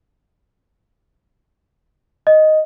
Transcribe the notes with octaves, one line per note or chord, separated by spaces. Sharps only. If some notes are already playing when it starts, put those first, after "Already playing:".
D#5